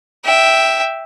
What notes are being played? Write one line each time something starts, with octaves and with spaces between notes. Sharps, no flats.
E5 G5